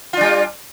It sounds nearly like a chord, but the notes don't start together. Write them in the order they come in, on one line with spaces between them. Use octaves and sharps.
F4 D4 G3